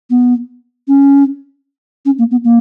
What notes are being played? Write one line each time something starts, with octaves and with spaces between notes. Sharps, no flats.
B3
C#4
C#4
A#3
B3
A#3